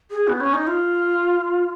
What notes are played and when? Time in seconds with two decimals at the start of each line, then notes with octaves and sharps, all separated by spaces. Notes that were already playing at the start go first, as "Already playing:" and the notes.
0.11 G#4
0.28 B3
0.40 C#4
0.54 D#4
0.67 F4